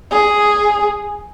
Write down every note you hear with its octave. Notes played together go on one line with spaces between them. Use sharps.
G#4